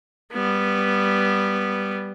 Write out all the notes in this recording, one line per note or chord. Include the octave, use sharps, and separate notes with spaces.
G3 B3